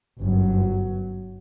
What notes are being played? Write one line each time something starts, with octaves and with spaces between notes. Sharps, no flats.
G1 F#2 F#3